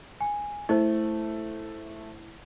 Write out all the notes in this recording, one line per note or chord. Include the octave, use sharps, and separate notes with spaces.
G#5
A3 E4 C5